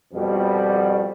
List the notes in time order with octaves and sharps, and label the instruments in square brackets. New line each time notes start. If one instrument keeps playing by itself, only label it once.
[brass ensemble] F2 B2 G3